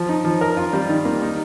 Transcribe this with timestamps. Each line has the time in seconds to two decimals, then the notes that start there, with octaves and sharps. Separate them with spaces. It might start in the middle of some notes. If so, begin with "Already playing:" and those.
Already playing: F3
0.09 D#4
0.25 F3
0.41 A#4
0.57 F4
0.73 G3
0.89 D#3
1.05 A#3
1.22 D#4